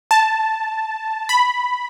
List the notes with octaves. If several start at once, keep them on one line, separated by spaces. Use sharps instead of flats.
A5
B5